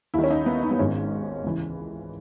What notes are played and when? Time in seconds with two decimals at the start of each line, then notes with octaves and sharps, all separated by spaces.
0.14 D#2 D#3 E4
0.24 C#4
0.31 D#4
0.46 B3
0.63 D#4
0.71 B3
0.79 G#1 G#2 D#3 C#4
1.44 C#2 C#3 E3